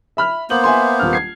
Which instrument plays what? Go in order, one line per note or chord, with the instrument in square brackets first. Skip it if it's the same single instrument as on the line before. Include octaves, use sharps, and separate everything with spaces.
[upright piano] E5 B5 F6
[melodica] A#3 B3 C5 [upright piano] F#7
[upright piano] E5 G#5 C6
D#1 F6
G#6 C7